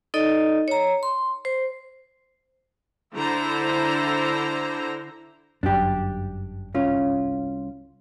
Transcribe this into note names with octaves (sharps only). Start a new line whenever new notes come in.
D#4 A4 D5 D#5
C#5 A#5
C6
C5
D3 E4 C5 A#5
G1 F#2 D4 G4
C2 C#4 F4